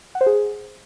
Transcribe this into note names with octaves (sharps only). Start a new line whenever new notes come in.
F#5
C5
G#4